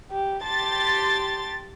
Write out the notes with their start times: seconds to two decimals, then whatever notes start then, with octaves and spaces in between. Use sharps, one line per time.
0.11 G4
0.44 G4 A5 C6 A6